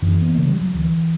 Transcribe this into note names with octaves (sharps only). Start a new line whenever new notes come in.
F#2 E3
B3
C#3 A#3
G3
F#3
D2 E3